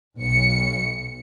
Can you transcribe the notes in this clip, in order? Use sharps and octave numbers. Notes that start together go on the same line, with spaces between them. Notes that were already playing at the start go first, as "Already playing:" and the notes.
B1 C#7